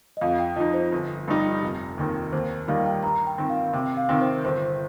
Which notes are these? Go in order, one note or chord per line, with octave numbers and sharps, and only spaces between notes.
D#5
F2 F5
G5
F3 D#4 D#5
C5
G1
G2 G3 D#4
F1
D#2 D#3 C4
D#2 C5
D#3 G3 A#3 D#4 F5
G5
G2 A#5
G5
D#3 C4
F5
C3 G5
F5
D#3 C4
C5
G1 C5